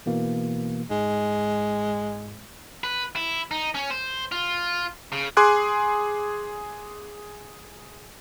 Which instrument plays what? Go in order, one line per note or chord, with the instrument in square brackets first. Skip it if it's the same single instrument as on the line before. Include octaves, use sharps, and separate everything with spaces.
[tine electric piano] B2 E3 A#3
[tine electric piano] G#2 [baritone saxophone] G#3
[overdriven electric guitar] B4
E4
D#4
C#4
C5
F4
C#3
[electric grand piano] G#4 G#5 C6 D6 F#6